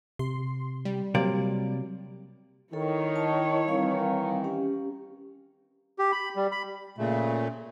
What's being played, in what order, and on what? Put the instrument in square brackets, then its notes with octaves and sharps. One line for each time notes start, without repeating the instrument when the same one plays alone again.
[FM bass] C3 [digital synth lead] C6
[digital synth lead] G3
[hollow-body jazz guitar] C3 A#3 D5 [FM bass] F#3
[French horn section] D#3 [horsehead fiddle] E4 C#5 [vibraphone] A4
[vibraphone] D#5 A5
[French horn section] D#3 E3 [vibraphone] G3 C4 F5
[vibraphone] C#4 G4
[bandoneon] G4
B5
G3
B5
[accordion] A#2 C#3 A3